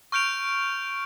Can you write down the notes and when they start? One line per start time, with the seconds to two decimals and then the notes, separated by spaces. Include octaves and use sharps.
0.12 C#6 F6 G6 D7 F7